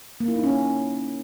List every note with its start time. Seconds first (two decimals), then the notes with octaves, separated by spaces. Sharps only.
0.20 A#3
0.28 E4
0.36 D#4
0.43 C#4